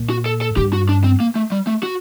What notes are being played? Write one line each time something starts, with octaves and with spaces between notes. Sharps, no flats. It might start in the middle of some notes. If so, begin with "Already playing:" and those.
Already playing: A#2
F#4
A4
A4
G2 G4
F#4
D4
C4
A#3
A3
G3
A3
F#4